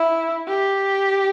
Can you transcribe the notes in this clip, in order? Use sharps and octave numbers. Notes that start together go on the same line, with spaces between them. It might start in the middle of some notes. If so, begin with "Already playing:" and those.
Already playing: E4
G4